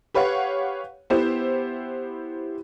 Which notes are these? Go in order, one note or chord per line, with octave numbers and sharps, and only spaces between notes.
G4 B4 C#5 F5 F#5
B3 E4 G4 C5